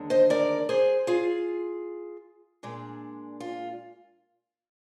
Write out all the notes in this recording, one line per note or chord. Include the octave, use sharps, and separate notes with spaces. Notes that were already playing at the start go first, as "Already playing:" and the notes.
Already playing: D#2 D3 G#3 D4
C5 D#5
A#4 D5
G#4 C5
F4 G#4
A#2 G#3 D4
F4